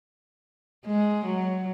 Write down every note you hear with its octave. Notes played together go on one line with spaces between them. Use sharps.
G#3
F#3